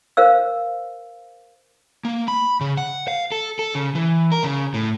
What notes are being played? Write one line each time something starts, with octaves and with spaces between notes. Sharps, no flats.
A#4 C5 F5 E6
A#3
B5
C#3
F#5
F5
A4
A4
C#3
E3
A#4
C#3
A2